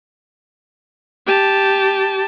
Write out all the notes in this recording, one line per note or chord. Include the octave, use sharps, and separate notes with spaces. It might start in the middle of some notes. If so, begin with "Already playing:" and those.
G4 A5